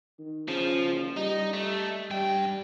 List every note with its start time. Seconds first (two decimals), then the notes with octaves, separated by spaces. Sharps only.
0.19 D#3
0.48 C#3 F3
0.85 F#1
1.16 G3 D#4
1.53 A3
2.11 G2 G3 G5